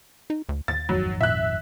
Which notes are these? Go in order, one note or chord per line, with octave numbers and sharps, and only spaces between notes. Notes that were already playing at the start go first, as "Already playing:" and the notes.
D#4
D2
D#2 A6
G#1 F2 D#3 F#3
A#2 E5 F#6